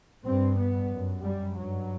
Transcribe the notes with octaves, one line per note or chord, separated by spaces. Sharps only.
G2 C4
B3
F#2
G3
G2 F#3